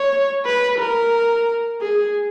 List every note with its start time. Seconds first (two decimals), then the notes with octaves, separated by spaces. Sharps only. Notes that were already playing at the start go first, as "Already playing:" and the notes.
Already playing: C#5
0.46 B4
0.79 A#4
1.81 G#4